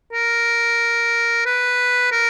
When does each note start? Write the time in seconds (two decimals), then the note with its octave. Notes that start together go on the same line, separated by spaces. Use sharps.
0.13 A#4
1.45 B4
2.12 A#4